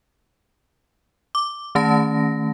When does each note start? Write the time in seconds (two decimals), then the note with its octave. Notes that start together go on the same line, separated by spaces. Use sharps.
1.35 D6
1.75 D#3 A3 C#4 A5 A#6